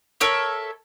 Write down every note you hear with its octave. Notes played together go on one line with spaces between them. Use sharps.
A4 A#4 C#5 E5